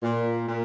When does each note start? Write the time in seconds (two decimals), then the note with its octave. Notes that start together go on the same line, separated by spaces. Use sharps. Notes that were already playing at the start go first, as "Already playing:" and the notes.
0.03 A#2
0.48 A#2